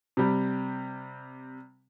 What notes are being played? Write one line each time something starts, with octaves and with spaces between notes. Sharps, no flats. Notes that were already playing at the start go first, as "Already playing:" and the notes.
C3 G3